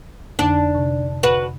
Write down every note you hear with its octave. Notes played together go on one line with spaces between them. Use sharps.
F2 D3 D4
C3
F#4 B4